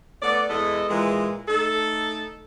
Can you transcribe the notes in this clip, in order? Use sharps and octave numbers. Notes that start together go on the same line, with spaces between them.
A3 B3 D5
E2 G#3 B3 A4 D#5
A#2 E3 G#3
A3 D#4 A4